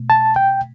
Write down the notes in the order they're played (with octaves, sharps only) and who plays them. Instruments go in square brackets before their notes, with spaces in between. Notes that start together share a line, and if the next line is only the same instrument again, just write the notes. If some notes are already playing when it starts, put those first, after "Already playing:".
Already playing: [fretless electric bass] B2 A3
[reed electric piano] A5
G5